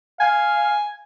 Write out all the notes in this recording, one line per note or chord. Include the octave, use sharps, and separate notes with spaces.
F5 G#5